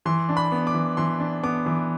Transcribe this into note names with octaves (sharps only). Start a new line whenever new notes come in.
E3 C6
D4
B5
B3
D6
E3
E3 C6
D4
B3 D6
E3